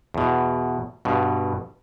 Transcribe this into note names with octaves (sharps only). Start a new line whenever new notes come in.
E2 B2
G2 B2